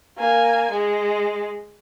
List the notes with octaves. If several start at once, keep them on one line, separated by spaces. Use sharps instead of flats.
A#3 G#5
G#3